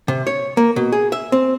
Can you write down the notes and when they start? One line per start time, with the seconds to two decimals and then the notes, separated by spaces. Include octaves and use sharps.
0.08 C3
0.27 C#5
0.57 A#3
0.76 B2
0.92 G#4
1.12 E5
1.32 C4